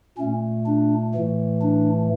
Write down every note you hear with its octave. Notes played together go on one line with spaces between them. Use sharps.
A#2 A3 C#4
D4
A2 E3 A3
D4